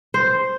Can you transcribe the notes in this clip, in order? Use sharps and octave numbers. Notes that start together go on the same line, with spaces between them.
C5